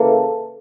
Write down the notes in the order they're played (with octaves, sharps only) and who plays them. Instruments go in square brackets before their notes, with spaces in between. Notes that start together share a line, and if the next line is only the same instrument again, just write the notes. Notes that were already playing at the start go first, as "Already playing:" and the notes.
Already playing: [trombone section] C#3 E3 A#3 A4